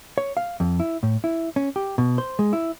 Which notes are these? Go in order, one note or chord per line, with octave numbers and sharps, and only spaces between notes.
C#5
F5
F2
E4
A2
E4
C#4
G4
B2
C5
G#3
E4